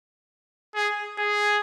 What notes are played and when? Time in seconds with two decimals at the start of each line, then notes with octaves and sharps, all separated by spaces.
0.75 G#4
1.18 G#4